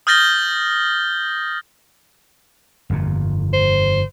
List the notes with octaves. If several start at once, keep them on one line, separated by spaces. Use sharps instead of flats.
D#6 F6 G6 A6 A#6 G7
G1 F2 A#2
C5